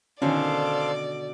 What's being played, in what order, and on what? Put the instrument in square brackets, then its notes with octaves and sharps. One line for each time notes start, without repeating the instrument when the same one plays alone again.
[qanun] B2 D3 [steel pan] D#3 C#4 [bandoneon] A4 C5 F5 [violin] D5